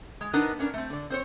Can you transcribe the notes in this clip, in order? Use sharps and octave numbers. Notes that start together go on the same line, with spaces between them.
G#3
B3 D4 D#4 A#4 D#5
B3 C#4 D4 A#4
A3 C4
D3 D5
C4 C5 C#5